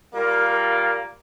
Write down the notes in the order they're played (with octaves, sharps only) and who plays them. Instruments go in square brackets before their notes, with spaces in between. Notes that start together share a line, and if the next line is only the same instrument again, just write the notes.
[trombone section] G3 A#3 F4 [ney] A#4